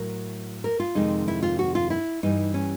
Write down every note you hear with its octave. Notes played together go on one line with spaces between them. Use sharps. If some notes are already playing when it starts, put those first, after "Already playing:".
Already playing: A2 F#3 A#4
A#4
F4
F2 C3 D#3 G#3 D#4
E4
F4
F#4
F4
E4
G2 E3 G3 D#4
C#4